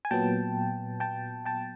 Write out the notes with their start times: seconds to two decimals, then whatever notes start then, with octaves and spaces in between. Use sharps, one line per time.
0.05 G#5
0.11 A#2 F#3 B3 G5 A5
1.00 G5 A5
1.45 G5 A5